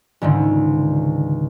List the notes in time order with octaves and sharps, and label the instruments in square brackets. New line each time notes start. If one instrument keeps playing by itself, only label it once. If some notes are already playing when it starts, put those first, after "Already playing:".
[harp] C#2 G#2 D3 D#3